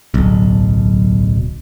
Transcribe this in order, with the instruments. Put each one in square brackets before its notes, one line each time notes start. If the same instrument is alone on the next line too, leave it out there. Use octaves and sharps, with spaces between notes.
[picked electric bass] D1 B1